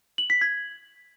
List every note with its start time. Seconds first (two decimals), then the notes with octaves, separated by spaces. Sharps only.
0.18 F#7
0.30 B6
0.41 G#6